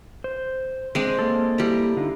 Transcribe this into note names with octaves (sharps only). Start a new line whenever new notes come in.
C5
G#3 C4 D4
A#3 A4
G3 E4 A#5
D3 D#4 F4